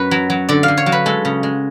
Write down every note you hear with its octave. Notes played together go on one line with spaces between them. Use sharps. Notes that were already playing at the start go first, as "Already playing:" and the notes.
Already playing: F#2 B4 C#5
F#3
F#3
D3 D5
F5
D3
C#5
F#3
B4
G#3 A4
C#3
G#3